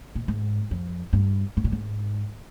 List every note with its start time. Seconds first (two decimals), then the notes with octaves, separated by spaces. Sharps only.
0.15 A#2
0.28 G#2
0.71 F2
1.13 G2
1.57 G#2
1.64 A#2
1.72 G#2